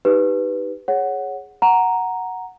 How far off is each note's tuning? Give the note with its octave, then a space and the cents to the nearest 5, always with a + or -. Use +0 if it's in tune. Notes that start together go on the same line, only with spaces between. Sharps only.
D#4 +10 G4 +0 B4 +0
G#4 +0 C#5 +0 F#5 +0
F#5 +0 A#5 +0